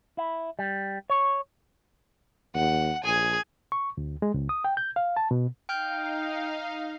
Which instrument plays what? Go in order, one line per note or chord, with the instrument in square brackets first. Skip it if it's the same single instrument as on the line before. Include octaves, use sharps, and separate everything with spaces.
[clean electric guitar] E4
G3
C#5
[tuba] D#2 [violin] F#5
[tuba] A#1 [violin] G#4 G#5
[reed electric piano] C#6
D2
G#3
C#2
D#6
G5
G6
F5
A5
B2
[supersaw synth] D#4 F5 [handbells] G5 F6 G6